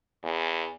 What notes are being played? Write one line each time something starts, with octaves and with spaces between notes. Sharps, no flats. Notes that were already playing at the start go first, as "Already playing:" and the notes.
E2